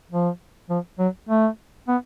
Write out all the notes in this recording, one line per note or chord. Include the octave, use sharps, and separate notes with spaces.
F3
F3
F#3
A3
B3